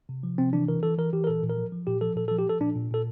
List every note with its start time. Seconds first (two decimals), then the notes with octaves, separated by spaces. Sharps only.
0.09 C3
0.23 F3
0.38 C3 C4
0.53 E3 D4
0.68 E3 A#4
0.83 E3 A4
0.98 E3 A#4
1.13 E3 G4
1.24 A#4
1.27 A#2 A4
1.42 A#2
1.50 A#4
1.57 F3
1.72 F3
1.87 A#2 G4
2.01 F3 A4
2.16 A#2 A4
2.28 A4
2.31 F3
2.39 G4
2.47 F3 A4
2.60 A#2 D4
2.76 A#2
2.91 A#2 A4